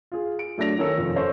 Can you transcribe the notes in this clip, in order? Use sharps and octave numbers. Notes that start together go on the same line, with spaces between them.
F4 G#4
D7
F#3 A3 D4 A#6 F7
D#3 C#4 A4 E6
F1 F3 A4
C#4 A4 C5 C#6